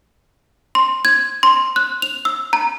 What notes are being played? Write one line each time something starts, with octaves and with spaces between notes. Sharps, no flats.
C6
G#6
C6
F#6
F7
E6
A#5